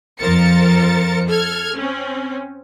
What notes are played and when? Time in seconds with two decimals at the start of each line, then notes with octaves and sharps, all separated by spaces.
0.19 F2 F3 A#4 C5 A6 C#7
1.28 A4 F6 G#6
1.76 C4 C#4